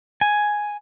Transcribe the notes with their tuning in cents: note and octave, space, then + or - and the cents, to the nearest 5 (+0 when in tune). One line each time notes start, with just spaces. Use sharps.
G#5 +5